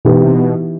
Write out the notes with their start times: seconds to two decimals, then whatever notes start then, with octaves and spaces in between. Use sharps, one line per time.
0.05 B2 E3 B3 D#4 G4
0.23 C3
0.34 B2